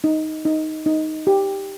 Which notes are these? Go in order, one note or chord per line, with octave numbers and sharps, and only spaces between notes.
D#4
D#4
D#4
G4